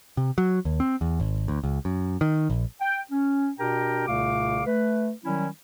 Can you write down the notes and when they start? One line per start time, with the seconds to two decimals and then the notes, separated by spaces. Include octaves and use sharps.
0.17 C3
0.38 F#3
0.65 D#2
0.80 C4
1.01 E2
1.20 G#1
1.48 D2
1.64 C#2
1.85 F#2
2.21 D#3
2.50 A#1
2.80 G5
3.10 C#4
3.59 B2 D4 G4 A#4 G5 A#5
4.07 C2 A#2 C#3 A3 F5 D6
4.66 A3 B4
5.24 D#3 F#3 G3 C#4 E4